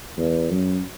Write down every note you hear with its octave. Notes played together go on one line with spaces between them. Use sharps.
E2
F#2